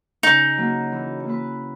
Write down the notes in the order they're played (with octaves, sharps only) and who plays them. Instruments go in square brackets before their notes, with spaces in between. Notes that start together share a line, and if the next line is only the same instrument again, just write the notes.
[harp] C#3 [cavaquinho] D#4
[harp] F#3 A#3
E3
A#3 E4 B4